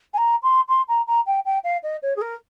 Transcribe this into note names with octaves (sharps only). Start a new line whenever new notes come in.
G#5
A#5
C6
C6
A#5
A#5
G5
G5
F5
D#5
C#5
G#4
A#4